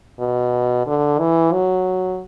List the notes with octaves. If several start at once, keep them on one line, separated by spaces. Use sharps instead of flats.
B2
D3
E3
F#3